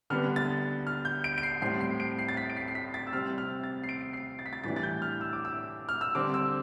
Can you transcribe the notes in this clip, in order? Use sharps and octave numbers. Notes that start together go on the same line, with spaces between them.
D3 G3 B3 D4 F6
A6
F6
G6
D7
D7
C7
A2 G3 C4 C7
C7
D7
C7
A6
B6
D7
C7
C7
B6
A6
E6
C3 G3 C4 F6
F6
A6
C7
D7
C7
A6
B6
A6
A2 E3 G3 D4 A6
A6
G6
F6
E6
D6
E6
F6
E6
D3 G3 C4 D6
E6